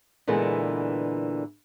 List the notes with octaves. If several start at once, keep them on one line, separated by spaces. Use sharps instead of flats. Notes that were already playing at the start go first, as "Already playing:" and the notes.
A#2 D3 E3 G#3 B3